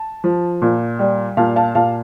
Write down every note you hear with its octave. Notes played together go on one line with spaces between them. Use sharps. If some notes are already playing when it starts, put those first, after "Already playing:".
Already playing: A5
F3
A#2
G3
A#2 F5 A5
F5 A5
A#2 F5 A5